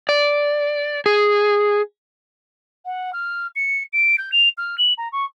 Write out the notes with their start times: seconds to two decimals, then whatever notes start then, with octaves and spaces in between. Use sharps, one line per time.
0.09 D5
1.06 G#4
2.85 F#5
3.13 F6
3.56 C#7
3.93 D7
4.18 G6
4.32 F7
4.57 F6
4.78 F#7
4.98 A#5
5.12 C#6